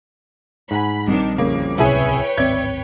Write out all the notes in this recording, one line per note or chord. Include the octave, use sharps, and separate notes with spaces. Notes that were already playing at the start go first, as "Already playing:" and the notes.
G#2 F#5 G#5 B5
A#1 D#3 G3 C4 D4
C2 F2 C#3 A#3
D1 C2 C3 E4 G#4 B4 C#5 G5
D1 G#1 C4 D5 E5 G#6